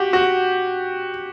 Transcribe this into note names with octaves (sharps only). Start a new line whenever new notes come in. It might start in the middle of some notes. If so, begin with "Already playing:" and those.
Already playing: F#4 G4
F#4